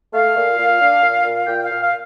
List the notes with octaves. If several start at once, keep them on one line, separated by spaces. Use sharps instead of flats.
A3 F5
A#2
A#2
D4
A#2
A#2
A#2 G5
F5
A#2
F5